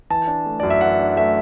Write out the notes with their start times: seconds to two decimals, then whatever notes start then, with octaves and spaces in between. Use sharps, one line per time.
0.10 E3 A5
0.27 D4
0.46 A3
0.60 F#2 D5
0.70 E5
0.81 E3 F#5
0.99 D4
1.17 A3 E5